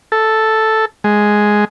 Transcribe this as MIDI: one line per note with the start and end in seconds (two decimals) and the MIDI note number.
0.12 0.85 69
1.04 1.65 56